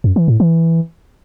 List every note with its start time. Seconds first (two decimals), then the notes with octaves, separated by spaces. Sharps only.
0.04 F#2
0.16 E3
0.28 A2
0.40 E3